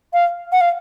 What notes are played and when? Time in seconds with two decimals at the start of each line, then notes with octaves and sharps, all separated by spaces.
0.13 F5
0.52 F#5
0.61 F5